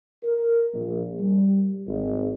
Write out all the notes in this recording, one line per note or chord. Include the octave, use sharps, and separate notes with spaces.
A#4
A#1
G3
G#1